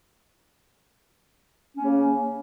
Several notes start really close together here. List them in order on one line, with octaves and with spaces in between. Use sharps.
C#4 A#3 C#3